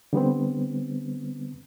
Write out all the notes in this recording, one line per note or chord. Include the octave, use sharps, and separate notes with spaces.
D3 G3 B3 C4